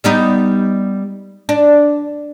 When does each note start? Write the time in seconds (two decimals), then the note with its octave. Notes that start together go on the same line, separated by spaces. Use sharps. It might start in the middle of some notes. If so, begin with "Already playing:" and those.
0.04 G3 B3 D#4
1.49 D4